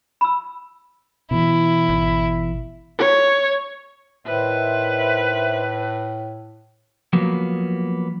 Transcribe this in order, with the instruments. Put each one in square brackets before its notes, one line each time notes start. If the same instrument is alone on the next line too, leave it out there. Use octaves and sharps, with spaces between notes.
[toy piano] B5 E6
[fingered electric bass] B2 E3 [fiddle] E4
[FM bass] G#1
[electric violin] C#5
[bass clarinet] A2 [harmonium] D#3 C5 E5 [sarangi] B4
[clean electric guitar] F3 F#3 A#3 B3